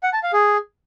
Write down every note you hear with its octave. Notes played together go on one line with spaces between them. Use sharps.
F#5
A5
F5
G#4